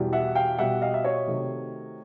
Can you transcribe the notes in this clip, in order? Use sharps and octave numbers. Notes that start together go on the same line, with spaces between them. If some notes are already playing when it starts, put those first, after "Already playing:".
Already playing: E2 B2 G3
E5 F#5
F5 G5
B2 G3 E5 F#5
D#5 F5
E5
C#5 D#5
C3 D#3 F#3 A3